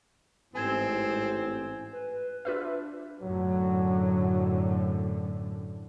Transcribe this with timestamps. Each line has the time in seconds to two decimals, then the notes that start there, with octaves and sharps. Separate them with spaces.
0.55 A1 G#2 C4 G#5 G#6 E7
1.92 B4
2.45 D4 F4 B4 E5
3.21 F#2 A2 D3 F#3